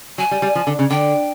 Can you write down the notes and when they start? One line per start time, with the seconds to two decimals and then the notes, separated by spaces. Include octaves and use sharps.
0.18 F#3 G#5
0.31 G3
0.42 G3
0.55 F3
0.67 D3
0.79 C#3
0.91 D3 G5